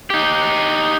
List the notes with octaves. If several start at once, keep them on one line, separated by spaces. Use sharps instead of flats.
D#4 G4